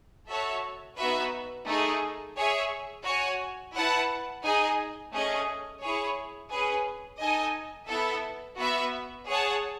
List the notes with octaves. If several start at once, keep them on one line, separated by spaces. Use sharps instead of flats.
F#4 A4 C#5 E5 A5
B3 D#4 F#4 B4 E5
A3 D#4 G#4 D#5
G#4 C#5 E5
F#4 C#5 G#5
E4 B4 F#5 A5
D#4 G#4 D#5 G#5
A3 C#4 G#4 D#5
E4 G#4 C#5
C#4 G#4 B4
D#4 A4 D#5 G#5
B3 E4 A4 E5
B3 F#4 B4 E5
G#4 C#5 F#5 A5